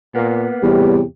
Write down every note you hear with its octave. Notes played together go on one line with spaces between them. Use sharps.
A#2 A#3 B3
E2 A2 C3 G3 G4